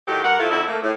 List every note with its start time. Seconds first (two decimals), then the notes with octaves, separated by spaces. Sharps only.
0.08 A2 D#3 F#3 G4
0.23 G2 A#4 F#5
0.39 A2 F3 A3 E4 F4
0.51 F2 D3 D#4 E4
0.67 A3 A#3
0.82 A2